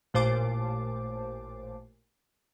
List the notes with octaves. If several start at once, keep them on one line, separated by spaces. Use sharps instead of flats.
A1 A#2 C5 A5 D6